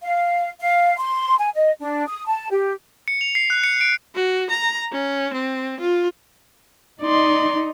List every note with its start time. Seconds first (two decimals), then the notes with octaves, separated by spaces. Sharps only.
0.02 F5
0.61 F5
0.98 C6
1.38 G#5
1.55 D#5
1.80 D4
2.08 D#6
2.26 A5
2.50 G4
3.08 C#7
3.21 F7
3.35 C7
3.50 F#6
3.64 C#7
3.81 D7
4.15 F#4
4.50 A#5
4.92 C#4
5.33 C4
5.80 F4
7.02 D#4 D5 C6